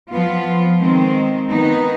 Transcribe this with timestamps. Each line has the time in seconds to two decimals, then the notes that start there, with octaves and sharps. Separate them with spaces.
0.09 F3 B3 F4
0.79 D#3 G#3 C4
1.49 D#3 B3 D#4